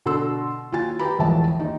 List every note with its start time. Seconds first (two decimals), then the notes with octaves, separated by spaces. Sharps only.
0.06 B2 D3 A4 C6 E6
0.72 D#2 F4 F#4 G#5 A6
0.99 G4 B4 A#5 B5
1.18 E1 A1 F3 G#3 E5 A5
1.60 D#2 D#4